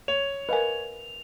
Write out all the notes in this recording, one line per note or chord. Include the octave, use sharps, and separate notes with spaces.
C#5 F7
A#4 B4 D#5 F5 G#5